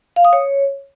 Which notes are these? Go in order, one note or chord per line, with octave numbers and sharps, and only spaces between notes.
F5
D#6
C#5